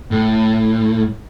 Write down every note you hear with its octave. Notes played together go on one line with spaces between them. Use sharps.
A2